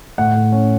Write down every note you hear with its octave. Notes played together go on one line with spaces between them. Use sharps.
A2 F#5
A2
C#4